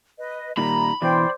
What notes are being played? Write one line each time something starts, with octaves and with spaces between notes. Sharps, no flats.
B4 D#5
A#2 D#3 G3 A#5 B5
E2 B2 E3 C5 D5 G5 C6